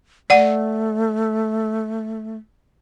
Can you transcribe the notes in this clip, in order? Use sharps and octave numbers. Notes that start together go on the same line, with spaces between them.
A3 D5 F#5